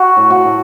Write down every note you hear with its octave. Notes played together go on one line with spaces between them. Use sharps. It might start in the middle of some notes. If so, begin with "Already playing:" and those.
Already playing: F#4
A2
F#4
A2